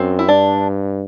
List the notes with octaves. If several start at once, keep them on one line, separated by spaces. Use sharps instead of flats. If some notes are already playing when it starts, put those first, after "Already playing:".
Already playing: F#2 C4
E4
G2 D4